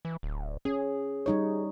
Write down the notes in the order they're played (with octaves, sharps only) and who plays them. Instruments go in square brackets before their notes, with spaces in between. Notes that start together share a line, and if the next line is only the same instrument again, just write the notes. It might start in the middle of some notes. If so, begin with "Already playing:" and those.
[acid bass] E3
D1
[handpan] C#4 [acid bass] G#4
[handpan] G3 D#4 C#5